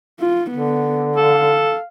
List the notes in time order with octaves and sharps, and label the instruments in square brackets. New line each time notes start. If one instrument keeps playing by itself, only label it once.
[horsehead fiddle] F4
[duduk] D3 [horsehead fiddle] B3
[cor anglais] A4 [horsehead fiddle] F5